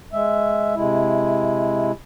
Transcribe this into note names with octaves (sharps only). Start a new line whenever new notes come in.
G#3 E5
C3 G#3 E4